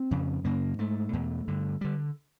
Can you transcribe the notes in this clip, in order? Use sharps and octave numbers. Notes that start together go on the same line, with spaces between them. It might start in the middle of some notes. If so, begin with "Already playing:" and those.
Already playing: C4
F2 C#3
F#2 C#3 A#3
G#2 A3
E2 B2
G2 D3
D3 G3